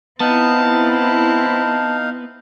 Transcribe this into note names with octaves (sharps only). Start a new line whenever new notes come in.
B3 C4 D#4 E4 F5 A5